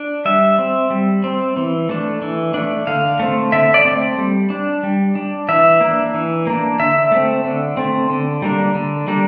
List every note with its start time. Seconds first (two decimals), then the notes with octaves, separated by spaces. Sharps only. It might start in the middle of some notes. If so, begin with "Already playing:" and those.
Already playing: D4
0.25 G3 E5
0.59 C4
0.90 G3
1.24 C4
1.57 E3
1.89 A3 D4
2.22 E3
2.54 A3 D4
2.87 D3 F5
3.20 A3 C4
3.52 D3 E5
3.74 D5
3.85 A3 C4
4.18 G3
4.50 D4
4.83 G3
5.15 D4
5.49 E3 E5
5.81 A#3 D4
6.14 E3
6.47 A#3 D4
6.79 D3 E5
7.12 A3 C4
7.44 D3
7.77 A3 C4
8.10 D3
8.42 G3 A#3 D4
8.75 D3
9.08 G3 A#3 D4